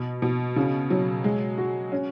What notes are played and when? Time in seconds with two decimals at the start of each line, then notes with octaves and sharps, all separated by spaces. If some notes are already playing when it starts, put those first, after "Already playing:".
Already playing: B2
0.22 B2
0.56 C#3
0.90 F#3
1.24 G#3
1.58 F#4
1.92 C#4